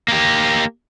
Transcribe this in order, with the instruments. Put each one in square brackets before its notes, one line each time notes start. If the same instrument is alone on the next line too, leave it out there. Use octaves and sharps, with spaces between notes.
[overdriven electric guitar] A#3 G4